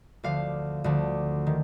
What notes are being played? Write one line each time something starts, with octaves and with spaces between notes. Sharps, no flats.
D2 D3 F3 F5
D2 D3 F3
D#3